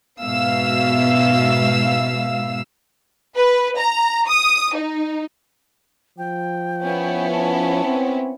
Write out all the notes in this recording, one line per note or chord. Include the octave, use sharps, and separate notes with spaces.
G#2 B2 E5 F5 E6
B4
A#5
D#6
D#4
F3 G5
B3 C#4 E4
A5
C4